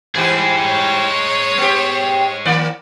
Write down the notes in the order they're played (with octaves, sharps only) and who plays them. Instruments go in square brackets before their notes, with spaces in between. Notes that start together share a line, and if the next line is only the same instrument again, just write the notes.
[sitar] G#2 E3 G4 [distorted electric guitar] G#4 C5
[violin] C#5
[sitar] B3 G4
D#3 A#3 D5